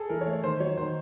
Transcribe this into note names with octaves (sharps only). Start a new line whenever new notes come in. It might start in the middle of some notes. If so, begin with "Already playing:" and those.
Already playing: G#4 A4
E3 A#4
C#5
A3
C#5
D#3 C5
F#3 C#5
D#3 C5